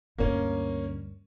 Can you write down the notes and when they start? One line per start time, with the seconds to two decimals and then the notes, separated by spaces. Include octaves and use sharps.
0.18 D2 G2 A#3 C#4